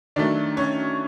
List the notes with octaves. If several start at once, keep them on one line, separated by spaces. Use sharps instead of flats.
D#3 F#3 A3 D4 D5
C#4 C#5